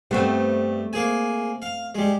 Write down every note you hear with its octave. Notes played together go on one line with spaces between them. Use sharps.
G2 A3 B3 C4
A#3 G#4 G#5
F5
G3 G#3